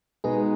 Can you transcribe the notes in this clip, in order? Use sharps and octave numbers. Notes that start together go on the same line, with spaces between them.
B2 G#3 D#4 G#4 B4